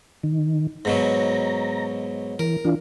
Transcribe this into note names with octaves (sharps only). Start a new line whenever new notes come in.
D#3
G#2 B2 F#3 A#5
E3 A#4
E3 D4 F4